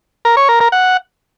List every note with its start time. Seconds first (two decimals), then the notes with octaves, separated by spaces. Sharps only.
0.25 A#4
0.37 C#5
0.49 A#4
0.60 A#4
0.72 F#5